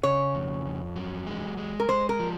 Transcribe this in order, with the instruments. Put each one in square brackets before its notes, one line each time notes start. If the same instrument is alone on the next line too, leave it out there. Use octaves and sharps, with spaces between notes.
[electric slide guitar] C#3 [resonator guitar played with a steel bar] C#5
[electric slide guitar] F2
F2
F#3
G#3
G#3
[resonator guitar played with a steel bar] A#4
[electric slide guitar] G#3 [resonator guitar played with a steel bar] C5
[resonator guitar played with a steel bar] A#4
[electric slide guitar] F3